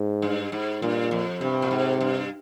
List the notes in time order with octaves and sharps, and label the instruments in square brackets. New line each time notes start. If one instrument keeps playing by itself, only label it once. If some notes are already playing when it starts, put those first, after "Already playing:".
Already playing: [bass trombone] G#2
[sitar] G2
G#2
[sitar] G2 [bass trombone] A#2
[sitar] F2
[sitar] G2 [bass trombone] C3
[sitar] A#2
G#2
G2